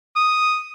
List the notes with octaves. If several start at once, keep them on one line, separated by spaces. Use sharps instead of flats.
D#6